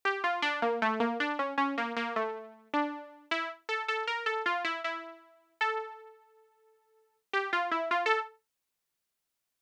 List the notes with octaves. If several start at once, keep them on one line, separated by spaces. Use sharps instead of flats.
G4
F4
D4
A#3
A3
A#3
D4
C#4
C#4
A#3
A#3
A3
D4
E4
A4
A4
A#4
A4
F4
E4
E4
A4
G4
F4
E4
F4
A4